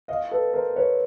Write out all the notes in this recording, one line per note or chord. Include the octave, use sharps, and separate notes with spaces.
D#5 F5
A4 B4
A#4 C5
B4 C#5